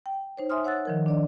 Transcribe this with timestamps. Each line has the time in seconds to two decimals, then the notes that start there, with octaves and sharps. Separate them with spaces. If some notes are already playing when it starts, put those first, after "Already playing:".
0.06 G5
0.37 D#4 C5 C#5
0.50 E5 G#5 C6 D#6 F6
0.64 C#5 F#5 E6 F#6 A6
0.85 D#3 F3 A#4
1.06 D4 D5 D#5